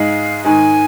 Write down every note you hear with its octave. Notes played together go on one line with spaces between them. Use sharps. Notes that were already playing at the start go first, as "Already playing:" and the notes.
Already playing: G#2 G#3 D#4 F5
G#2 D#3 G#3 G#5